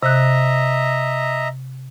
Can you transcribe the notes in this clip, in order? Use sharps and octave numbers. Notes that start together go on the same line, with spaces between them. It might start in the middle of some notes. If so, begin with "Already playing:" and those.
C3 D#5 E5 A#5 F#6